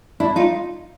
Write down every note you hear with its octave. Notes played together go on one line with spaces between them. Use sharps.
D4 E4
D#4 F4